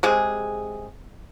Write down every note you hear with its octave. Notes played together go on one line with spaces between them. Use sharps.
C3 G#3 G#4